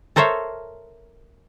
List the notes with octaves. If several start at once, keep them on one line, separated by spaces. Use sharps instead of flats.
A4 A#4 C5 C#5 E5 F5